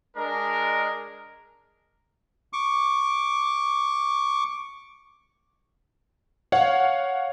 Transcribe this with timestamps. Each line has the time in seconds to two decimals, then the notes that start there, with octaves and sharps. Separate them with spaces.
0.15 G#3 D4 A#4
2.53 C#6 D6
6.52 C#5 F5 F#5